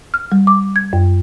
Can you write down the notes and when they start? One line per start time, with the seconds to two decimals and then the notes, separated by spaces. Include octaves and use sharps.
0.14 F6
0.32 G3
0.47 D6
0.76 G#6
0.93 F#2